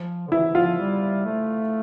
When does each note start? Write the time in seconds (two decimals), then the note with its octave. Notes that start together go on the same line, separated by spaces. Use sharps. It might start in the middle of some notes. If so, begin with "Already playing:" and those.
Already playing: F3
0.28 D3
0.32 E3 E4
0.55 F3 F4
0.78 G3
1.25 A3